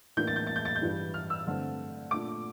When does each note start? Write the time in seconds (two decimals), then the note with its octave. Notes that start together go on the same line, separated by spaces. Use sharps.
0.17 A2 E3 A#3 D4 G6
0.27 A6
0.36 G6
0.47 A6
0.56 G6
0.65 A6
0.76 G6
0.82 G2 E3 G3
1.14 F6
1.30 E6
1.46 G2 D3 A3 C4
2.11 A#2 A3 D4 D6